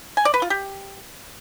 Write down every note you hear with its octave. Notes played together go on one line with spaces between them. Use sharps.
G#5
D5
B4
F4
G4